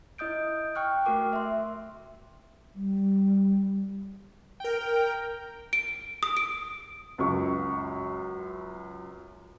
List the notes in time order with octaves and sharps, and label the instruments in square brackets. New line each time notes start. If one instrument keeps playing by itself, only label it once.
[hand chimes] E4 D#5 D#6 G6 D7
G5 C#6 F6 F#6
A3 F#4 A#4 D6
E5 C6
[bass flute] G3
[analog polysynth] A#4 G5
[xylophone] D7
D#6
D7
[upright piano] C#2 F#2 C#6